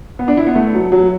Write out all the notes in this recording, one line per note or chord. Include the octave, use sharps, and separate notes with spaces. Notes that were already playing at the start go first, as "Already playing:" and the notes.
B3
D4
E4
B3
A3
F#3
F#3